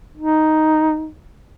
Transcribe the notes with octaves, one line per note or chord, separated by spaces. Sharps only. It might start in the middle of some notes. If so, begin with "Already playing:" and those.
D#4